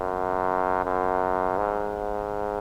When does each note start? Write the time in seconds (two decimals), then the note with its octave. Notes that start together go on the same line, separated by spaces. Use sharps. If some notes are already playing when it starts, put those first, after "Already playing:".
Already playing: F#2
0.85 F#2
1.58 G#2